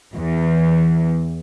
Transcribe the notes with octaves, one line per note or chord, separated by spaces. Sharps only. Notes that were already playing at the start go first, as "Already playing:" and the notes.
E2